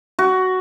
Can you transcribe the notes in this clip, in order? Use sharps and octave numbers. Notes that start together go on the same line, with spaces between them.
F#4